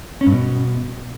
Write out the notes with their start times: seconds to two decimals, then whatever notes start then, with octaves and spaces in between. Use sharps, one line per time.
0.21 C#4
0.26 G2
0.32 B2